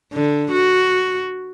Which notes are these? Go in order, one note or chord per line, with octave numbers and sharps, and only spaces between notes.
D3
F#4